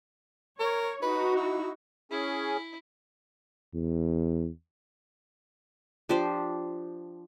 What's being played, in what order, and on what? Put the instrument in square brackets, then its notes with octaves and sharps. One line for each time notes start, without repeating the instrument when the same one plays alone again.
[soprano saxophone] A#4 [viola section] C#5
[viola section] D#4 F#4 [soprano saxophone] B4
[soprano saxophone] E4
[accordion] C#4 G#4 [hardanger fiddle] E4
[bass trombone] E2
[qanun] F3 D4 G4 C5